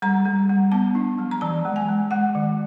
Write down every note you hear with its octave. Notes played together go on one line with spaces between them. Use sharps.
G3 A#5
G3
G3
B3 A5
D4
F#3
A#5
E3 A5
G#3
G#5
G#3
G#3 F#5
D#3